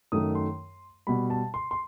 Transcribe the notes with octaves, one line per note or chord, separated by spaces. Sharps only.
F#2 D#3 A3 D#6
C6
B2 G3 B5
A5
C6
C6